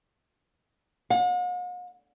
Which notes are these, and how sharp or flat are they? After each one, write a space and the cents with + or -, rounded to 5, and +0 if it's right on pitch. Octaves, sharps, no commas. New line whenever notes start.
F#5 -45